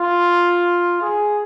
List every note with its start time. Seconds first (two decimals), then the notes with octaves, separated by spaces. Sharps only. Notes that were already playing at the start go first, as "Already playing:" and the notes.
Already playing: F4
1.01 G#4